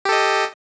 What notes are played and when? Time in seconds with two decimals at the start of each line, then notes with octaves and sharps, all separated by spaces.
0.05 G4
0.09 A4
0.12 D#5